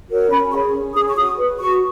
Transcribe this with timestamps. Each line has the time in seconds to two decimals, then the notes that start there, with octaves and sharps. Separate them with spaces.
0.09 F#4 A#4 C#5
0.30 C#4 B5
0.51 G#4 C#5 C#6
0.73 C#4
0.95 G#4 C#5 D#6
1.10 C#6
1.16 F#4 D#6
1.38 B4
1.59 F#4 C#6